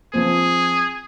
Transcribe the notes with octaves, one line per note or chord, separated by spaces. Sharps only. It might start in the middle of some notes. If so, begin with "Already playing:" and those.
F3 C4 G#4